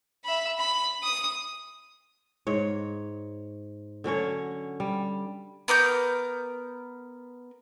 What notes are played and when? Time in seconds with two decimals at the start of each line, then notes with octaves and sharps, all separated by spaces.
0.24 E5 B5
0.58 B5
1.03 D#6
2.47 G#2 C#5
4.04 D3 F#3 C#4 C#5
4.80 G3
5.68 B3 A#4 D6 G6